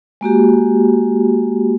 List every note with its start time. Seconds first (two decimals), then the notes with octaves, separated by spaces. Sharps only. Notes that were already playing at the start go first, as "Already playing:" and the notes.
0.21 G#3 A#3 F#4 G4